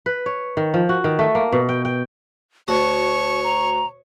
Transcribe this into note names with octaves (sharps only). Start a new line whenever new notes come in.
B4
C#5
D#3
F3
F#4
D#3
A3
A#3
B2
G5
G5
D2 F#4 C#5 A5 C#6
A#5